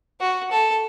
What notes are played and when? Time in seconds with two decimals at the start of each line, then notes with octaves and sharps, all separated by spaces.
0.20 F#4
0.51 A4